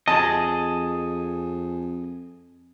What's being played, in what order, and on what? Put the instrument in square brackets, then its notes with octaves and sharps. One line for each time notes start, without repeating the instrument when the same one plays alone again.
[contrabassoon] F2 [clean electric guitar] G#4 D#5 [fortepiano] A5